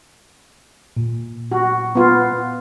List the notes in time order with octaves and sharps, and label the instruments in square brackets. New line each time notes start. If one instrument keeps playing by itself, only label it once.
[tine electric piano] A#2
[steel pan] F#4
B3 F4